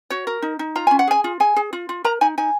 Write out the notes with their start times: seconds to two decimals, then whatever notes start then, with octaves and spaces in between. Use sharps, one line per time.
0.10 F#4 C#5
0.27 A#4
0.42 D#4
0.59 D#4
0.76 F4 A#5
0.87 C#4 G#5
0.99 F#5
1.07 G#4 G#5
1.24 F4
1.40 G#4 G#5
1.56 G#4
1.73 F4
1.89 F4
2.04 A#4 A#5
2.21 D#4 G#5
2.38 D#4 G#5